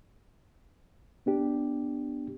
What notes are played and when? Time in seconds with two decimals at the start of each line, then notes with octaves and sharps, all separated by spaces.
1.26 B3 D4 G4